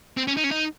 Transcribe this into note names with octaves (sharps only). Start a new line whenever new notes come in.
C4
C#4
D#4
C#4
D#4